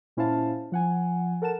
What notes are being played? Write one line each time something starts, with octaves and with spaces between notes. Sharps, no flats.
A#2 C#4 E4 C5 F5 A5
F3 F#5 G#5
A4 A#4 F#5 A5 E7